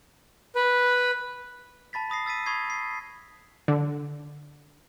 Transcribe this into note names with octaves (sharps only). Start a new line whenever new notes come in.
B4
A5 B5 A6 B6
B5 D#6 A#6 C7
E6 A6 B6 D#7
B5 C#6 D#6 G#6 C7
C7
D3